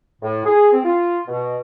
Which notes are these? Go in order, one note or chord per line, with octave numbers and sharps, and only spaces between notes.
A2
G#4
C4
F4
B2